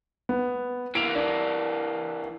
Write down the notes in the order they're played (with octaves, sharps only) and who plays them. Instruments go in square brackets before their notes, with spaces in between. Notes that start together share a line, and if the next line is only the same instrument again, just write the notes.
[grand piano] B3
[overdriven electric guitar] E3 A#3 [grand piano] D7 F7
[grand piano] D4